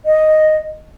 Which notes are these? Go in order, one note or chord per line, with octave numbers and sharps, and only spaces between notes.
D#5